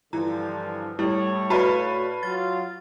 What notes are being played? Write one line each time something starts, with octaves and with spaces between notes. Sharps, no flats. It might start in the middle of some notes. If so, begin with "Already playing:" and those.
G2 D3 E3 F3 A#5
A2 G3 E4 C#5
F#4 B4 D5 F5 A5
F#3 F4 A6